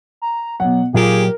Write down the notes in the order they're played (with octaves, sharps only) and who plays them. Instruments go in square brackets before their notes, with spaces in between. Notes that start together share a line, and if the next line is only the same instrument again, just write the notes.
[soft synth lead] A#5
[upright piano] B2 F#5 [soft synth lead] F#3
[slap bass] A#2 F#3 [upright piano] F4 [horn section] G4 G#4 [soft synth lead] A#4